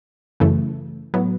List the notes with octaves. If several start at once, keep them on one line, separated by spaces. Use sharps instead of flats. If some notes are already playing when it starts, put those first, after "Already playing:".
F#2 C#3 E3 A3
A2 F#3 B3